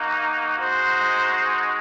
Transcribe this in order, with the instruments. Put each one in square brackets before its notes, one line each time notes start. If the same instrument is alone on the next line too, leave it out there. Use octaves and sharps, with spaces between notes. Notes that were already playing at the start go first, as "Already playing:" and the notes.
Already playing: [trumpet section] A#3 D#4 F#4
G#3 D#4 F#4 C5